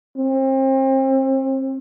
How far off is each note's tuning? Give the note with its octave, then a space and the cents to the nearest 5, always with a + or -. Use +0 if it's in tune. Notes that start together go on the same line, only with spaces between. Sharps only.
C4 +35